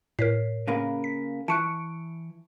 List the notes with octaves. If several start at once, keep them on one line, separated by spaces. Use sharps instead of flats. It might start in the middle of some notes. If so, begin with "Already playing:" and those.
A2 A#4 C#5 B6 C7
C#3 A#3 B4
B6
E3 A5 C#6 F#6 C#7 D7